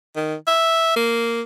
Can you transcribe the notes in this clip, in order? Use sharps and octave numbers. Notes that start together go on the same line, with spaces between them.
D#3
E5
A#3